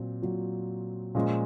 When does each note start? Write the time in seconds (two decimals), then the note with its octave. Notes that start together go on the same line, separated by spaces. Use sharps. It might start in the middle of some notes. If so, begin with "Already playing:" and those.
Already playing: A#2 F#3 C4
0.22 A#2 F#3
1.15 A#2 F3 G#3 C#4